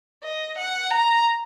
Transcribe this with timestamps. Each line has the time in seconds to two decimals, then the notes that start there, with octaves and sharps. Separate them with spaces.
0.24 D#5
0.58 F#5
0.91 A#5